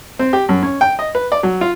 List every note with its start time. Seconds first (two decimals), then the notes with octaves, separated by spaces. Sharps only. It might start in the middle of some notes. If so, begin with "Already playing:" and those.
0.19 C4
0.33 G4
0.49 F#2
0.63 C#4
0.81 G5
0.99 D#5
1.15 B4
1.32 D5
1.43 F#3
1.61 F4